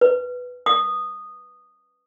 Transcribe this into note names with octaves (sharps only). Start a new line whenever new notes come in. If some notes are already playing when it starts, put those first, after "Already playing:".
B4
D#6